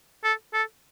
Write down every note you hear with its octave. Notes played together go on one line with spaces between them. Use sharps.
A4
A4